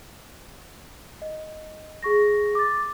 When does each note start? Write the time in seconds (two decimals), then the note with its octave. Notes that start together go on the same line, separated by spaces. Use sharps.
1.22 D#5
2.03 G#4 C#6 A#6
2.55 D6 A6